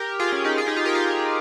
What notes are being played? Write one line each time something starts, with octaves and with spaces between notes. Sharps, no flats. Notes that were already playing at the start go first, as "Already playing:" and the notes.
Already playing: G4 A#4
F4 G#4
C#4 F4
D#4 G4
F4 G#4
D#4 G4
F4 G#4
G4 A#4
F4 G#4